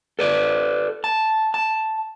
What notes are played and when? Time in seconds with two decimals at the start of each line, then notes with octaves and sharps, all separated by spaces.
0.19 A4 B4 D5
1.04 A5
1.54 A5